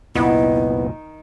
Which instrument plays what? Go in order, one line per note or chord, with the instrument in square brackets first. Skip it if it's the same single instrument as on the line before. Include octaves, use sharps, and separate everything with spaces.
[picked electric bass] F1 C2 A#2 [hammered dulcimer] D#3 [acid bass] B3 [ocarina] E4